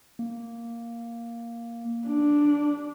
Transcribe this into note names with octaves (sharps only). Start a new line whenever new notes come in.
A#3
D4